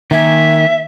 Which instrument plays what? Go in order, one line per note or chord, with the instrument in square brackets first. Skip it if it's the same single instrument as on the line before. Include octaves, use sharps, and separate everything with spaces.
[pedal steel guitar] D#3 A#3 G#5 [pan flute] E5